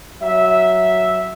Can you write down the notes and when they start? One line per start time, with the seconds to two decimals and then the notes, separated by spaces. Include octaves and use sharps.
0.23 F#3 E5